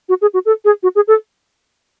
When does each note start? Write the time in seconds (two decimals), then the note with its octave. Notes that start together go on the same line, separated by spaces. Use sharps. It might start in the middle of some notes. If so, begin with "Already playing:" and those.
0.09 F#4
0.22 G#4
0.34 F#4
0.46 A4
0.65 G#4
0.83 F#4
0.95 G#4
1.08 A4